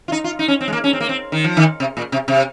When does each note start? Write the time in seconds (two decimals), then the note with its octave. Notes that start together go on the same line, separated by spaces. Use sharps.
0.08 F4
0.12 D#4
0.24 F4
0.39 D#4
0.48 C#4
0.61 C4
0.68 G#3
0.73 A#3
0.84 C#4
0.93 C4
1.00 A#3
1.09 C4
1.32 D#3
1.44 F3
1.57 D#3
1.80 C3
1.97 A#2
2.12 C3
2.28 C3